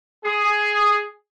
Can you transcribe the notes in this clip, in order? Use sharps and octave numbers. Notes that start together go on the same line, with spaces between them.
G#4